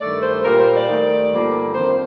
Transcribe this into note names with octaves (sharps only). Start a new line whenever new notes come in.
G2 D#3 A3 D5
C5
A#2 G3 A#3 A#4
C5
D5
D#2 D#3 A3
G2 D3 F3 A#3
F2 D#3 A#3 C5